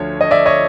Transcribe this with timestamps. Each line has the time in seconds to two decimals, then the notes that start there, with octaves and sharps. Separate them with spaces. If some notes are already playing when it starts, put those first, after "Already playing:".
Already playing: D2 D3 F3 C#5
0.21 D#5
0.31 D5 E5
0.46 C#5 D#5